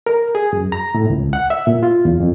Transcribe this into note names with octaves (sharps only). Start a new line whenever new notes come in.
A#4
G#4
F#2
A#5
A2
C#2
F#5
E5
A#2
F4
E2
F2